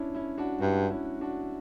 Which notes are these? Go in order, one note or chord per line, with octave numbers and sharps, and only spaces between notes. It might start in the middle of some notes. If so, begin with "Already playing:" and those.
Already playing: C#4 D4 E4
C#4 E4
D4 F#4
G2 D4 F#4
C#4 E4
D4 F#4